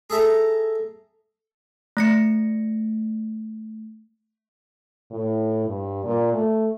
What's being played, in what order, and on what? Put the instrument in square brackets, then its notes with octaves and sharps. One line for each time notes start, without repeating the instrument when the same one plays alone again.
[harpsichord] G#4 A4 E5 A#5
[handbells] A3 A#6 C#7
[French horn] A2
G2
A#2
A3